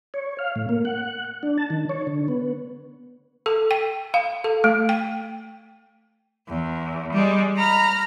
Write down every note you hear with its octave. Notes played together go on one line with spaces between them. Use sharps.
C#5
F5
A2
A#3
F#5
D4
A5
D#3
C#5
D3
B3
A4
G5
F5
A4
A3
G5
E2
G3 G#3
A#5 B5 F6